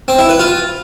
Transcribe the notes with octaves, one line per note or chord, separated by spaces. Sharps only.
C4
E4
B4
F4